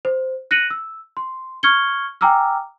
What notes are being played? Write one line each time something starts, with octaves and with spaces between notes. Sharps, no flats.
C5
F#6 A#6 C#7 D#7 F#7
E6
C6
C#6 F6 G#6 C#7 G7
G5 G#5 A#5 D6 E6 F6